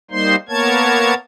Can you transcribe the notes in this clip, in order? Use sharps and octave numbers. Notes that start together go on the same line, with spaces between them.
G3 A#3 D#4 C5 C6
A#3 B3 A#4 C#5 A5 G#6